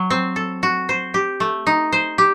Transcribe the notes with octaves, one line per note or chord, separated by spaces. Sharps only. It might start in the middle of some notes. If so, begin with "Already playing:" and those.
Already playing: F#3
C4
A4
F#4
C5
G4
A3
D#4
C5
G4